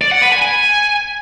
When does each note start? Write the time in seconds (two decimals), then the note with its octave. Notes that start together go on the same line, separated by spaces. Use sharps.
0.01 D5
0.11 F#5
0.22 B4
0.32 G#5
0.42 G#5